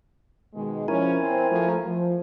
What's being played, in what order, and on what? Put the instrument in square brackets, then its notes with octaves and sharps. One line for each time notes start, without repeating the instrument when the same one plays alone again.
[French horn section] B2 D#3 G#3
[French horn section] F3 C#4 [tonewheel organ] E4 A#4 G#5
[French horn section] C4
F3 A3
F3